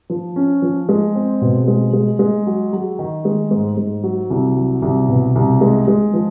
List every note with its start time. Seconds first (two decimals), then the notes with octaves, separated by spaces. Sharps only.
0.10 F3
0.36 C#4
0.62 F3
0.89 G#3
1.15 C4
1.42 B2
1.68 G#3
1.93 G#3
2.19 G#3
2.47 F#3
2.73 F#3
2.99 D#3
3.25 G#3
3.51 G#2
3.77 G#2
4.03 F#3
4.30 C2
4.56 F#3
4.82 C2
5.09 B2
5.35 C2
5.61 G#3
5.87 G#3
6.13 F3